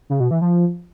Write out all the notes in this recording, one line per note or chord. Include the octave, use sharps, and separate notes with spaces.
C#3
B2
E3
F3